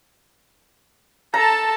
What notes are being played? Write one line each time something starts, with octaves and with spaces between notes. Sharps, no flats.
A4 A5 A#5